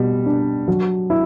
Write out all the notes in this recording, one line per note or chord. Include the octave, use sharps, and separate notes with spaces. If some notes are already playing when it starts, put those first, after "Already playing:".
Already playing: B2 G3
D4
F#3
E4